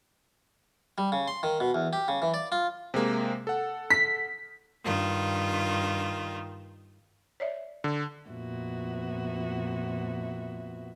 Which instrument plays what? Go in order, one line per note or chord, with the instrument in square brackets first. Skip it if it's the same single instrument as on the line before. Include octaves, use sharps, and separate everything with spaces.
[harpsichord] G3
C#3
C6
D#3
B2
E2
G4
C#3
E3
D5
F4
[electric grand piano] C3 G#3 A#3
A4 F#5
[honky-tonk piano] B6
[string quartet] G2 D#3 F4
[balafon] C#5 D5 E5
[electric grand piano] D3
[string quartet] F2 A#2 B3 F#4 E5